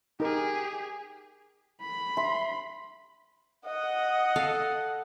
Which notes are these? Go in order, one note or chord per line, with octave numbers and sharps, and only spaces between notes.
D#4 G4 G#4 A#4
B5
E5 C6
D#5 F#5
A4 F5